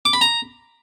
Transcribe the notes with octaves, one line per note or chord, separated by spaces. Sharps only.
D6
B5
A#5